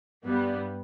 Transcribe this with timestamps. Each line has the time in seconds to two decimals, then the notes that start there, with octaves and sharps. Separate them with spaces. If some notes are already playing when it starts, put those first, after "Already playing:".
0.24 G2 G3 B3